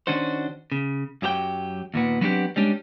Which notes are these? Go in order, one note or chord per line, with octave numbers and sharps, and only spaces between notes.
D#3 C#4 D4 F#4 C5
C#3
F#2 F#3 G4 A#4 G5
D#2 A#2 B3
F#3 B3 C4 D4 F#4 G4
G3 G#3 C#4 D4 G4